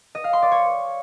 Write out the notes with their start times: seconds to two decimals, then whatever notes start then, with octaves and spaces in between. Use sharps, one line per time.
0.15 D#5
0.24 F5
0.33 C6
0.42 D5
0.52 C#5